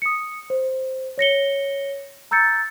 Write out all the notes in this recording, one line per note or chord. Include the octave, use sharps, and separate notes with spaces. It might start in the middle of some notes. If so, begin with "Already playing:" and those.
D#6 C#7
C5
C#5 A#6 C#7 G7
A#5 E6 G6 A6 C#7